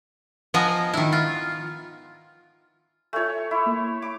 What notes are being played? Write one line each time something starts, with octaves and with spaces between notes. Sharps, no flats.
F3 B3 D#5 G#5 A#5
D#3 E4
F4
A3 F4 C#5 E5 G#5
E4 E5 C6 D6
A#3
D6